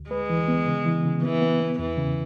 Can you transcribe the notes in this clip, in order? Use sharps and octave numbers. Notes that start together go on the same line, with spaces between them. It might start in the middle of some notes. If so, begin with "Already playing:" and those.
Already playing: D2
G#3 B4
E3
B3
C#3
E3
C#3
E3 B3
B3
B3
E2 E3
C#3